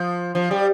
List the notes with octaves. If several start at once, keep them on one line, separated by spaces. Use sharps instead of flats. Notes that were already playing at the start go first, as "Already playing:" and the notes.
Already playing: F3
F3
G3